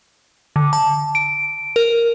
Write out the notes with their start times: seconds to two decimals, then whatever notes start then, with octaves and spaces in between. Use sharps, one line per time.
0.56 D3
0.73 A5
1.15 D7
1.76 A#4